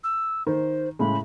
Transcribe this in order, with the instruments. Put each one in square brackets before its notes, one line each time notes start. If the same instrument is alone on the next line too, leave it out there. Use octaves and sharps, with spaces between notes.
[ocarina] E6
[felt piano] D#3 [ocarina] C5
[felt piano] A2 C#3 G#3 [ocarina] B5